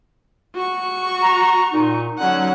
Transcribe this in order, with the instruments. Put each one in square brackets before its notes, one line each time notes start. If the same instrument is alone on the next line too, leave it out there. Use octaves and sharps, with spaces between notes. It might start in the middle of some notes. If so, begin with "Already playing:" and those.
[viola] F#4 C#6
[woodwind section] A#5
A#2 D#4
[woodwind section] D3 C#4 D#4 [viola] F#3 F#5